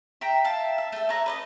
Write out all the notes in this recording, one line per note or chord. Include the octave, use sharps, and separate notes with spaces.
E5 G5 A#5
E5 F5 A5
E5
A3 A4
A3 C#5 A#5 F#6
B4 D5 D#5